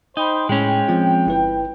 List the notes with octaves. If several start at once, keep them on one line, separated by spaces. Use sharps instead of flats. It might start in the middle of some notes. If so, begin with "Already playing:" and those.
D#4 C5 G5 B5
A2 G#3 C#4 G5
F3 C4 F4
G1 E4 B4